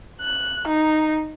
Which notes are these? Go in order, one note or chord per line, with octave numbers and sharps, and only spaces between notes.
F#6
D#4